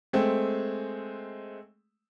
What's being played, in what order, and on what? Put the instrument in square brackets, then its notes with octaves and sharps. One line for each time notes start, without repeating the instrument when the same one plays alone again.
[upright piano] G#3 A3 C4